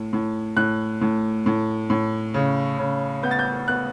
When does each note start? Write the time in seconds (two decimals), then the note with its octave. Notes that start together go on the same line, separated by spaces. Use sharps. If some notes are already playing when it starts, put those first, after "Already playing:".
Already playing: A2
0.13 A2
0.57 A2 F#6
1.01 A2
1.46 A2
1.90 A2
2.34 C#3
2.79 C#3
3.23 B3 G6
3.31 A6
3.39 G6
3.68 B3 F#6